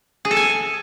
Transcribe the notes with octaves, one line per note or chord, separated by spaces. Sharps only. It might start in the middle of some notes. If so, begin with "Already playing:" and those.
G#4
A4
G#5